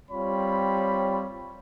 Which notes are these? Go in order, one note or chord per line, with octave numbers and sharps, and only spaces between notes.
G3 C4 F4 C#5 B5